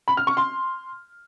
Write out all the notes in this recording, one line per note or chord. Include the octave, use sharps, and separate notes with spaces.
B5
F6
C#6
C6